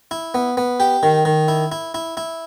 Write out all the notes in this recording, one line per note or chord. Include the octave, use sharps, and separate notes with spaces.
E4
B3
B3
G4
D#3
D#3
E4
E4
E4
E4